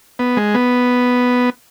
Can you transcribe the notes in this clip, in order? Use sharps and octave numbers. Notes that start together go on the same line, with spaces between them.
B3
G#3
B3